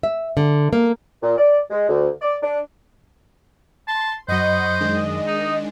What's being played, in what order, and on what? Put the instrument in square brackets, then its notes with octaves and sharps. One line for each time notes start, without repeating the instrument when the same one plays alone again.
[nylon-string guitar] E5
D3
A#3
[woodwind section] A#2
D5
G#3
D2
D5
D4
[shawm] A5 [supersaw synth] C6
[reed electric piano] F#2 F#3 [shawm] C5 [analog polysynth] D#5 [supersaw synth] F#5 B5 C#6
[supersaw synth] D#3 G#3 D4
[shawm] D#4